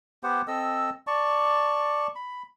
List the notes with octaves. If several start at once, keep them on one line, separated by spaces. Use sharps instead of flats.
B3 G4 C5 F#5
C4 A4 D#5 E6
D5 A5 C#6
B5